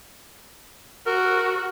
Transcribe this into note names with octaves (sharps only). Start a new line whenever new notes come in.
F#4 A#4